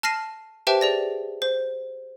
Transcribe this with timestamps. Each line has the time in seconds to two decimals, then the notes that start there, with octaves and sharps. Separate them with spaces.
0.03 A5 F6 A#6 C7 D#7 E7
0.67 G4 B4 C5 E5 G5 A5
0.81 G#4 D5 A#6
1.42 C5